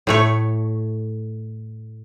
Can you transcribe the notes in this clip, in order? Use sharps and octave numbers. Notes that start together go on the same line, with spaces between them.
A2 A3 C#5